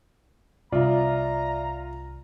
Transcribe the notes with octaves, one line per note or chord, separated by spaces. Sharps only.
C2 F4 D5 E5 A#5